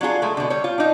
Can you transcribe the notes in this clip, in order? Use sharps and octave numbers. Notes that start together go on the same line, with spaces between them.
F#3 D4 F4 G#4
G#3 A3
B2 D3
G3 C#5
F4
D4 D#4